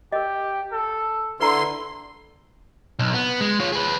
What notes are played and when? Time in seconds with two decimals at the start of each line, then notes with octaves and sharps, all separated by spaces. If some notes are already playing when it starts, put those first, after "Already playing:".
0.12 G4 A#4 D#5
0.72 A4
1.40 D3 E4 B4 A#5 C6
2.99 B1
3.14 B3
3.41 G#3
3.60 F4 C#5
3.72 G#4 B4